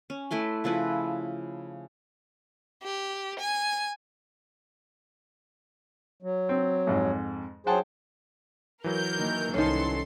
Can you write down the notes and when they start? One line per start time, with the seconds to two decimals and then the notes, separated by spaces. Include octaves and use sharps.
0.10 C#4
0.31 A3 E4 B4 C6
0.64 C#3 F3 E4 B4
2.83 G4
3.40 G#5
6.23 F#3
6.49 C4
6.87 F2 G#2
7.67 F#3 G#4 C5 F#5 G5 A5
8.84 E3 F#3 A#4 G6
9.17 D#3 A#3
9.54 C2 D#3 C#4 A4 C6